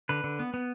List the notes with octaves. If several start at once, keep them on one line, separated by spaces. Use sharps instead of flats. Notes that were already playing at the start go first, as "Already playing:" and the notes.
D3 B4
D3
B3
B3